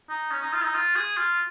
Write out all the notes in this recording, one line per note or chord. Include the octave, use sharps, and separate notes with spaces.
D#4
C#4
D#4
F4
D#4
F4
G#4
F4